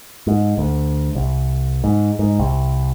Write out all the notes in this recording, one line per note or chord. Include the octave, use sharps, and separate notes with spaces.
G#2
D2
C2
G#2
G#2
C2